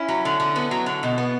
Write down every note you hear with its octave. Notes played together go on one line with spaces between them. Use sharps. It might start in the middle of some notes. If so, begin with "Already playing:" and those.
Already playing: C#4 E4
F#3
D3
D3
B3
F#3
D3
B2
B3